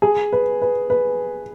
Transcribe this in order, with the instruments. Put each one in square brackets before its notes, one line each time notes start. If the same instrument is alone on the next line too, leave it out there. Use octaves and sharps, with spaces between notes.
[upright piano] G#4
B4
B4
B4